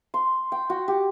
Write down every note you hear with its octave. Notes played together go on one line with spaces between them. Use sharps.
C6
G5
F#4
G4